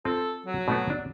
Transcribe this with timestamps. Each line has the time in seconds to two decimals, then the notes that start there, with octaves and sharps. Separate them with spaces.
0.05 C4 F4 A4
0.46 F#3
0.68 B2 A3 B3
0.90 D4